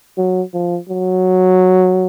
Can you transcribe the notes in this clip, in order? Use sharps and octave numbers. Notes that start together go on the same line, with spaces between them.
F#3
F3
F#3